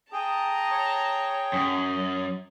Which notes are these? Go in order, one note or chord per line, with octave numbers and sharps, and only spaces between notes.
G#4 G5 A5 A#5 D#6
C#5
F#2 D#6